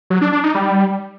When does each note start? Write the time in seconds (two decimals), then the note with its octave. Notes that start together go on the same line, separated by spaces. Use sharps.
0.10 F#3
0.21 D4
0.33 D4
0.44 D#4
0.55 G3